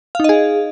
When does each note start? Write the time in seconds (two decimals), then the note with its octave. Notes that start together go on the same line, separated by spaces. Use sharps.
0.15 F5
0.20 D#4
0.24 D#5
0.29 G#4